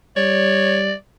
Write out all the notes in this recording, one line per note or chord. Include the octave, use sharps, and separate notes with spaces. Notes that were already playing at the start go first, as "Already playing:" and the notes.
G3 C#5 D5